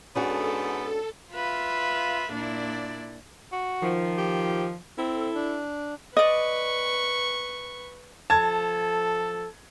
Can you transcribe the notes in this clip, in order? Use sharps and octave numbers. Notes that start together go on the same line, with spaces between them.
G#2 B3 C#4 D4 F#4 A4
F4 B4 E5 F5
A#2 D4 E4 D5
F#4
D#3 F3
G4
C4 E4 A4
D4
B4 D5 D#5 C#6
F3 A4 A5 G#6